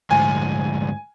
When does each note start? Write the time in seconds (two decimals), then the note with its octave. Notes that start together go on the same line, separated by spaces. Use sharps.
0.11 D2 G#2 G#5